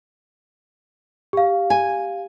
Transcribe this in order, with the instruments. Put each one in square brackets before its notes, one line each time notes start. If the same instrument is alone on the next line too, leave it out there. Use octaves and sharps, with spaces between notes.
[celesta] G4 F5
[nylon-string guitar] G#5